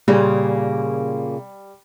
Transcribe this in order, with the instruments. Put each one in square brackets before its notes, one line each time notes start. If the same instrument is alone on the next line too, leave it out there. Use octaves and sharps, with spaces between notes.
[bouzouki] A#2 C#3 A#3 [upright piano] G3